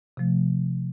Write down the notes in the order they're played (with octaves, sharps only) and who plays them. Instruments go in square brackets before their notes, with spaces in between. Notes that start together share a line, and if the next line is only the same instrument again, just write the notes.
[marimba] C3 F3 A3